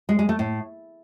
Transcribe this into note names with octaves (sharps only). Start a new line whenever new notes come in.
G#3
G#3
A3
A2